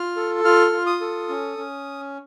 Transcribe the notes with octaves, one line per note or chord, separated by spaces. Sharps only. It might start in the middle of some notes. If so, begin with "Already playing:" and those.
Already playing: F4 F6
A4
F4 F6
F4
D#6
A4
C#4
C#4